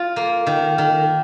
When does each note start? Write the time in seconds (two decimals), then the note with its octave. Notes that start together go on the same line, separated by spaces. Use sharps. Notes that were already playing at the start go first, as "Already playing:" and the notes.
Already playing: F4
0.16 A#3
0.47 D#3
0.78 D#3